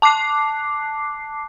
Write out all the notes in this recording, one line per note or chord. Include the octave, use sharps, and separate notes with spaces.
A5 D6 F#6 C7